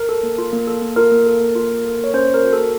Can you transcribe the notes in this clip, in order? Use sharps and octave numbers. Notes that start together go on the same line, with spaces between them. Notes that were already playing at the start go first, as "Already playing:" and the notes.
Already playing: A#4
A4
A#3
F4
A#3
A4
A#3
F4 A#4
A#3
A4
A#3
F4
A#3
A4
A#3 C#5
C#4 C5
A#3
A#4
F#4
A4
A#3